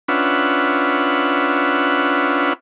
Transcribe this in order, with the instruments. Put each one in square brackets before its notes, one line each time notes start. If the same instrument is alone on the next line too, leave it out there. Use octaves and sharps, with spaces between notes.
[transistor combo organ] C#4 D4 F4 B4 E5 F#5